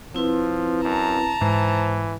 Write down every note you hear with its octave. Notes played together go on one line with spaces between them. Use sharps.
F3 C4 E4 B4
F#2 A5 A#5
G#2 E3 C5